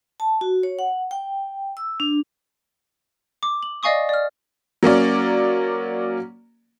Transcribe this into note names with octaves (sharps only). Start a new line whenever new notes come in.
A5
F#4
C#5
F#5
G5
E6
D4
D6
F#7
D5 D#5 F5 G#5 C#6 D#6
D5 F6
F#3 A#3 C#4 D5